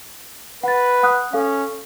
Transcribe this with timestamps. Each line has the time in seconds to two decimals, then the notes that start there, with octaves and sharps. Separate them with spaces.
0.63 B4 F#5 A6
1.03 F#5 D#6 F#6
1.33 C#4 A4 F5